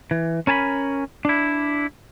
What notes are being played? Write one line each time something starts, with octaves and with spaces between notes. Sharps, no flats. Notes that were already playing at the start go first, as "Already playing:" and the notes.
E3
C#4 A#4 G#5 A5 B5
D4 E4